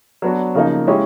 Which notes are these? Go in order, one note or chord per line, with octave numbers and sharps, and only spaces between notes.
F#3 B3 D4 F#4
C#3 F3 A#3 D#4
G#3 C#4 E4 G4